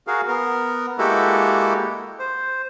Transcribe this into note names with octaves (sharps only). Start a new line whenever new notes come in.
F#4 G#4 A#4 F5
B3 A#4
G#3 A#3 E4 F#4 G4 A4
C5